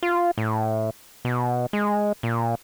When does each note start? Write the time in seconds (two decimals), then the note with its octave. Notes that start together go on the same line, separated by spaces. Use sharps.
0.03 F4
0.38 A2
1.25 B2
1.73 G#3
2.23 A#2